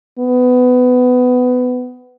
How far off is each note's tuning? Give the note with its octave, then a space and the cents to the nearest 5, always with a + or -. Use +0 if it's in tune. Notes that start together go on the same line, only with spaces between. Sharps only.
B3 +20